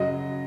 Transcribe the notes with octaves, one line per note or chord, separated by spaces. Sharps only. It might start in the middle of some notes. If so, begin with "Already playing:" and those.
Already playing: F#2 C#3 F#3 D#5